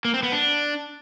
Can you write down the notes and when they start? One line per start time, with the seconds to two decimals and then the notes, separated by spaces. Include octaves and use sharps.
0.05 A#3
0.14 C4
0.23 B3
0.32 D4